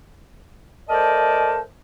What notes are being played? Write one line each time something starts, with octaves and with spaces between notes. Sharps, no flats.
A3 A#4 C5 D5 D#5 A5